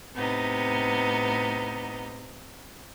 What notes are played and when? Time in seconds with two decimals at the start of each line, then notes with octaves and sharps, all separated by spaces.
0.14 A2 C3 B3 D#4